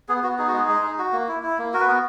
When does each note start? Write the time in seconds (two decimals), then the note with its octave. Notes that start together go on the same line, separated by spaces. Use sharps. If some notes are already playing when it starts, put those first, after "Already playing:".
0.09 B3 G#4
0.23 B3 F#4
0.38 D#4 G#4
0.48 F#4
0.53 G#3 G#4
0.69 G#3
0.83 D#4
0.99 F#4
1.13 A#3
1.28 E4
1.43 E4
1.58 A#3
1.74 F#4 A#4
1.80 B4
1.87 B3 A#4